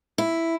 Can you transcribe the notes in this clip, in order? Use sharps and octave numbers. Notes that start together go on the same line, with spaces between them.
E4